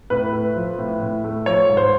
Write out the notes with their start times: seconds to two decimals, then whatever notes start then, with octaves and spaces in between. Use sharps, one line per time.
0.10 A2 B4
0.33 A3
0.56 F3
0.79 A2
1.01 A2
1.24 A3
1.46 F3 C#5
1.69 G#2
1.77 C5